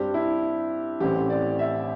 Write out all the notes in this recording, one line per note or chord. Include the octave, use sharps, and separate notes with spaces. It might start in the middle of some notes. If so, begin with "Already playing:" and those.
Already playing: G2 G3 C4 G4
E4
A1 A2 E3 C4 G4
D5
E5